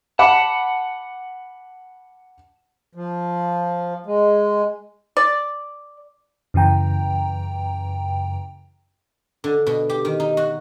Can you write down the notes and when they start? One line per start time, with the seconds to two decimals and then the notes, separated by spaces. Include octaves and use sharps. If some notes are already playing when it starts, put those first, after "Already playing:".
0.19 F#5 A5 B5 D6
2.95 F3
4.06 G#3
5.17 D5
6.54 F#2 C#3 E3 G5 A#5
9.44 D3
9.67 B2
9.90 G4
10.05 D#3
10.20 D#4
10.37 F#4